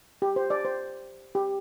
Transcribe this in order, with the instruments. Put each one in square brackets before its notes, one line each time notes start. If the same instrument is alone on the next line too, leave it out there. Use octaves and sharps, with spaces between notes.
[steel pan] G4
C5
D5
C5
G4